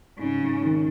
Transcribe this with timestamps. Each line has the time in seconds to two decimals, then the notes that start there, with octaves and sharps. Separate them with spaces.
0.18 G#2 C#3
0.41 G#2
0.63 D#3